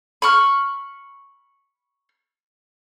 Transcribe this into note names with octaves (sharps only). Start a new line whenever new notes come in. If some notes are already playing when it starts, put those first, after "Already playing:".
B5 C#6 F6